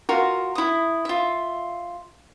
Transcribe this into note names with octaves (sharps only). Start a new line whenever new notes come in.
F4 F#4 A#4
E4 D#6
F4 E5